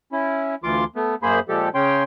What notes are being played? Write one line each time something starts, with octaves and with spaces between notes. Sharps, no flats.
C#4 E4
D2 E3 F4 C6 D6
A3 B3
F#2 A#3 G#4 C5 B5
A#2 F3 G#3 G4 A4
C#3 C#4 C#5 G5 C6